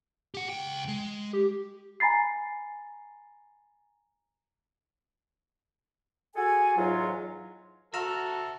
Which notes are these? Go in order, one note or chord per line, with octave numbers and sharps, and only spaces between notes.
G4 F#5
C#2 G5
G#3
G4
G#5 A#5 B5 A6 C7
F#4 G#4 A4 G#5
E2 G#2 F#3 F4
F#4 A4 C5 E5 A#5 E6 F6